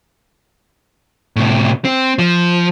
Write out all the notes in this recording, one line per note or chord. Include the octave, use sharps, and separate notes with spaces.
A2 C3
C4
F3